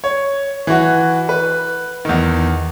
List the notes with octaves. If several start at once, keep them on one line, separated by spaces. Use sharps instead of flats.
C#5
E3 F#4
B4
E2 D#3